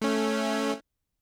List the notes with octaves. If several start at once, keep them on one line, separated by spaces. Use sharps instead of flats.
A3 C#4